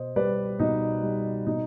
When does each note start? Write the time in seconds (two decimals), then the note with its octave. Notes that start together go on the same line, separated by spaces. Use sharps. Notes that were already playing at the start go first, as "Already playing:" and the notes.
Already playing: B2 C5 D#5
0.16 G3 B4 D5
0.59 B2 D#4
1.02 G3
1.46 B2 D#4